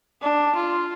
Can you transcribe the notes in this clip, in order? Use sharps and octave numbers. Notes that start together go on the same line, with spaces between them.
D4
F4